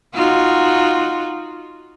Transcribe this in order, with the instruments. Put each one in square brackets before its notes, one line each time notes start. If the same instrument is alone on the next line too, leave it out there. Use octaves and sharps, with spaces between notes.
[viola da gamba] D#4 F4 F#4